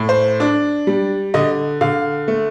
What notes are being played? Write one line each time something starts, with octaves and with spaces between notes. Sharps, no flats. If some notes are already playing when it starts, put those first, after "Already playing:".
Already playing: A2
C5
D4
G3
D3 D#5
D3 F5
A3